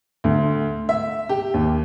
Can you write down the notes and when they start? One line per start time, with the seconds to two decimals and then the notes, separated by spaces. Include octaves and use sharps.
0.24 D2
0.89 E5
1.29 G4
1.54 D#2